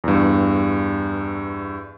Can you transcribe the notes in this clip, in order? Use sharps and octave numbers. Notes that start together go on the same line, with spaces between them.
E2 G2